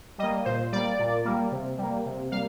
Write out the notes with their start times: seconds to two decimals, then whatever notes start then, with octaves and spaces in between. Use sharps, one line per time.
0.18 G3 D#5
0.23 A#3
0.45 A#2 C5
0.72 G3 A#3 D5
0.99 A#2
1.25 G3 A#3
1.51 C3
1.78 G3 A#3
2.06 C3
2.32 G3 A#3 F5